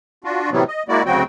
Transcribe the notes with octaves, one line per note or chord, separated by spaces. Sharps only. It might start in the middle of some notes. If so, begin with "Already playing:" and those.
D4 F4 F#4
A2 C3 E3 F#3 G3 B3
D#5
G#3 A#3 E4 F#4 D5
D2 C#3 F#3 C4 F#4 G5